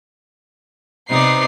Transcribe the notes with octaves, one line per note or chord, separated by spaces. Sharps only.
C3 B3 D#4 D5 C7